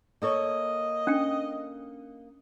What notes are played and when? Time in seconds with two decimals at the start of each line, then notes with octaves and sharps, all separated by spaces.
0.22 A#3 A4 C#5 D#5
1.07 C#4 D4 G5